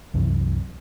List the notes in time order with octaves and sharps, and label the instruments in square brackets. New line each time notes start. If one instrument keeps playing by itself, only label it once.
[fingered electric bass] C2 F#2 C3 E3